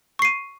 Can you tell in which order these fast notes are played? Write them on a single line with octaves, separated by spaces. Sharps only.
C#6 C7 D#7